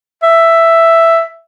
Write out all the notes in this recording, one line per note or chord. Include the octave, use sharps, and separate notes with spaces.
E5